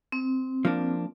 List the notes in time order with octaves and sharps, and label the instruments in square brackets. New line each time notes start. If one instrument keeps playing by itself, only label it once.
[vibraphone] C4
[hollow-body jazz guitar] F3 A#3 D4